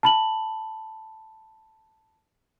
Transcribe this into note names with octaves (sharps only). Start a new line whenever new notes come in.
A5 B5 F#7